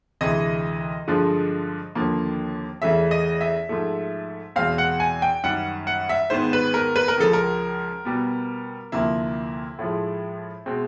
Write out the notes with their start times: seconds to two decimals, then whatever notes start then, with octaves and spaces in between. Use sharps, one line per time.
0.21 D2 C3 E3 G#3 D#5
1.08 G2 D3 F3 G#3
1.95 D#2 D3 F3 A#3
2.82 E2 C#3 E3 A3 E5
3.11 D#5
3.41 E5
3.69 G#2 F3 A3
4.56 E2 B2 G#3 C4 F5
4.78 F#5
5.00 G#5
5.22 G5
5.43 F#2 D#3 G3 F#5
5.87 F#5
6.09 E5
6.30 G#2 D#3 G#3 B3 C5
6.53 B4
6.74 A#4
6.96 B4
7.08 A#4
7.18 C#2 C#3 F3 A4
7.33 A#4
8.05 B2 G3 B3
8.92 D2 C3 F3 A#3 E4
9.79 A2 F3 G#3
10.66 B2 G#3 C4